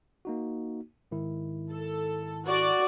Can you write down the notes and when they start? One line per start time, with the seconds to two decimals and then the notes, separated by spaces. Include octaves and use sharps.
0.25 A#3 D#4 F#4
1.11 G#2 D#3 E4
1.71 A4
2.46 F#4 D5